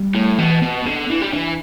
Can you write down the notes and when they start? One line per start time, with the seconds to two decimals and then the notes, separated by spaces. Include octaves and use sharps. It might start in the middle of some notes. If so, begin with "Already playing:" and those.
Already playing: G3
0.15 A2
0.38 B2 E3
0.62 B2 B3
0.85 D3 B3
1.10 E3 D4
1.22 G3
1.33 E3 D4